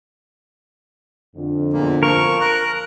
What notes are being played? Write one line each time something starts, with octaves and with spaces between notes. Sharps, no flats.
F2 D3
E2 A#2 A#3
F3 A#4 C#6
A#5 F#6